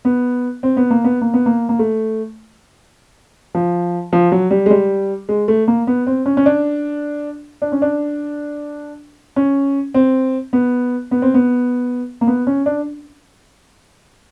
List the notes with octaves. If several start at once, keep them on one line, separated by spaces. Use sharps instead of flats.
B3
C4
B3
A#3
B3
A#3
B3
A#3
A#3
A3
F3
F3
F#3
G3
G#3
G3
G#3
A3
A#3
B3
C4
C#4
C#4
D4
D4
C#4
D4
C#4
C4
B3
B3
C4
B3
A#3
B3
C#4
D4